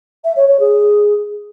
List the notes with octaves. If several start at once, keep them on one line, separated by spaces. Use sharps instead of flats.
E5
C#5
C#5
G#4